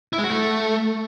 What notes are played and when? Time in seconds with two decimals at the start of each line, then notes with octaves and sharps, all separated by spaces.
0.13 E4
0.18 G#3
0.24 F#4
0.30 A3